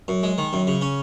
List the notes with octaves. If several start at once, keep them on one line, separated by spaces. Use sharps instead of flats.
F#2
G#3
D#3
F#2
C#3
C#4